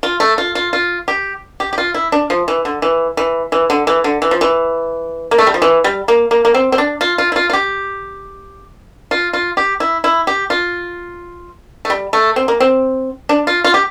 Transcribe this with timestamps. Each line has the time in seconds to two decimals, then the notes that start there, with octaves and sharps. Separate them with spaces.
0.03 F4
0.20 A3
0.38 F4
0.55 F4
0.73 F4
1.08 G4
1.60 G4
1.73 G4
1.78 F4
1.94 E4
2.12 D4
2.30 F3
2.48 E3
2.65 D3
2.82 E3
3.17 E3
3.52 E3
3.70 D3
3.87 E3
4.04 D3
4.22 E3
4.31 F3
4.41 E3
5.31 A#3
5.38 A3
5.47 G3
5.54 F3
5.62 E3
5.84 G3
6.08 A#3
6.31 A#3
6.45 A#3
6.54 C4
6.72 C4
6.78 D4
7.01 F4
7.18 F4
7.32 E4
7.36 F4
7.50 F4
7.53 G4
9.11 F4
9.33 F4
9.57 G4
9.80 E4
10.04 E4
10.27 G4
10.50 F4
11.85 A3
11.90 G3
12.13 A3
12.36 C4
12.48 A#3
12.60 C4
13.29 D4
13.47 F4
13.64 F4
13.74 G4